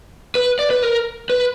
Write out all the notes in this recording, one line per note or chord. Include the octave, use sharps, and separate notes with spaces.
B4
D5
B4
A#4
B4